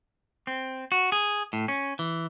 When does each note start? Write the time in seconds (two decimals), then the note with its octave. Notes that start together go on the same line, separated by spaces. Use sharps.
0.47 C4
0.92 F#4
1.12 G#4
1.53 A2
1.68 C#4
1.99 E3